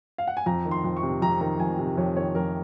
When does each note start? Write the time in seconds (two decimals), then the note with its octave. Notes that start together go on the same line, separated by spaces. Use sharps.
0.18 F5
0.27 F#5
0.37 G#5
0.46 F2 A#5
0.65 D#3
0.71 C6
0.84 F2
0.97 C#6
1.03 C3
1.22 F2 A#5
1.41 D#3 A#5
1.60 F2 G#5
1.79 C3
1.97 F2 C#5
2.16 D#3 C#5
2.35 F2 A#4